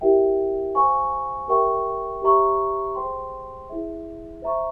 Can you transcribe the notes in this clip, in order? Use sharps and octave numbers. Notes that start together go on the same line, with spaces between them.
E4 G4 A#4 E5 G5
C5 F5 G#5 C#6
G4 A#4 E5 G5 C#6
G4 C5 E5 A#5 C#6
G#4 C5 G5 C6
E4 G#4 E5
C5 E5 A#5 C#6